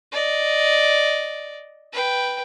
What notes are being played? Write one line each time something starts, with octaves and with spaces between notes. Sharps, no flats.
D5 D#5
B4 G5